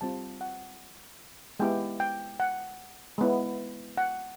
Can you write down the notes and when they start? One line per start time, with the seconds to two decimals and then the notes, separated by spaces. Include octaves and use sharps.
0.01 G3 C4 F4 A5
0.41 F#5
1.60 G#3 B3 E4 G4 G5
2.00 G5
2.40 F#5
3.18 G#3 B3 E4
3.97 F#5